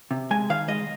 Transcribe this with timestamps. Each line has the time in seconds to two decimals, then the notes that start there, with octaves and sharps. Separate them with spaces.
0.11 C3
0.31 G#3 G#5
0.50 D#3 F5
0.68 G#3 D#5